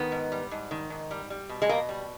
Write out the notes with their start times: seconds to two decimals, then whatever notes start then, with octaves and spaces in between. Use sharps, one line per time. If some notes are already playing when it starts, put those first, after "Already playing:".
Already playing: D#3 B3
0.12 G#2
0.32 G3
0.51 G#2
0.71 D#3
0.90 G#2
1.11 G3
1.30 G3
1.49 B2
1.62 G#3
1.69 B2 A#3
1.89 G3